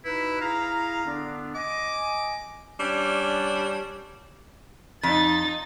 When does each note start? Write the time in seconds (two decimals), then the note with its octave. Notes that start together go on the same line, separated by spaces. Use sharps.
0.05 B2 D#4 E4 B4
0.41 E4 G#4 F5 A#5
1.05 D3 B3 D4
1.55 D#5 G#5 D6
2.79 G3 C#4 D4
5.03 F2 D#4 A6